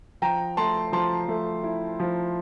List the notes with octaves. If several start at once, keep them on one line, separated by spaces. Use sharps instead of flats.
F3 G5 A#5
A3 A5 C6
F3 A5 C6
A3
E4
F3